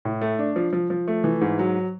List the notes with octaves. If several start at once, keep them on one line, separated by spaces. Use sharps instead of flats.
A2
A3
D4
F3
F3
F3
A3
E3
G#2
F#3